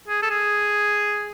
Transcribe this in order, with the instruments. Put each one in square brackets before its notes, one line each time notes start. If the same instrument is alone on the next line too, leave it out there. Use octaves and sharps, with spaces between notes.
[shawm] G#4
A4
G#4